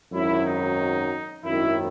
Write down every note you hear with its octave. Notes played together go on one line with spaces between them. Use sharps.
G#1 F#2 D#3 F#3 E4
D#4
G#1 F#2 D#3 E4